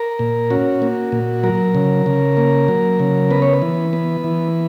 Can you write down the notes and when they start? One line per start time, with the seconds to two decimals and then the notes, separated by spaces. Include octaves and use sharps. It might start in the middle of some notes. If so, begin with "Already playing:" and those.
Already playing: A#4
0.19 A#2
0.50 C#4 F#4
0.82 A#3
1.12 A#2
1.43 F#3 A#4
1.75 C#3
2.06 C#3
2.37 A#3
2.68 F#3
2.99 C#3
3.31 B3 B4
3.42 C#5
3.53 B4
3.62 E3
3.93 B3
4.24 E3